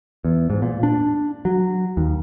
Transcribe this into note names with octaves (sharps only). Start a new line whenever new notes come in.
E2
G#2
A#2
D4
F#3
D#2